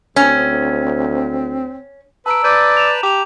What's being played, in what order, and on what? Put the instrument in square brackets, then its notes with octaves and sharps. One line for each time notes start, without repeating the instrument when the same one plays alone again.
[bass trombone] D2 [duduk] C4 [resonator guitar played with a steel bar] C#4
[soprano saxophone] B4 [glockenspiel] A5 A#5 D7 [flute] E6
[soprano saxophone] B4 [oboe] D5 [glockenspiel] G6 D#7
[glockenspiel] E7 F7
[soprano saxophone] G4 [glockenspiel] D6 F7